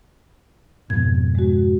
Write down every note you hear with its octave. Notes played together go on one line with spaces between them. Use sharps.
F2 G#2 B2 G#6
G#3 F#4